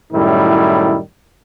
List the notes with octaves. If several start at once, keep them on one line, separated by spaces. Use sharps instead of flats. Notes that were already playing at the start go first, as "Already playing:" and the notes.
F#2 A2 D#3 G3 E4